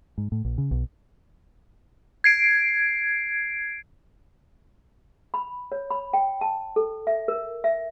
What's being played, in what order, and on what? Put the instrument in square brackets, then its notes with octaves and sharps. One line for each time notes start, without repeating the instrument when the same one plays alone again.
[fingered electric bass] G#2
A2
A#1
C#3
B1
[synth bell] G#6 C7 D7
[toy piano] B5
C#5
B5
G5
A5
A4
E5
A#4
E5